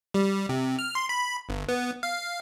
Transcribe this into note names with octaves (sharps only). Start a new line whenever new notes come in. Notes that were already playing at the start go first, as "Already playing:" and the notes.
G3
C3
F6
C6
B5
G1
B3
F5